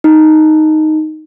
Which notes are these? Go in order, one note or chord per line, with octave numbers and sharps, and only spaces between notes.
D#4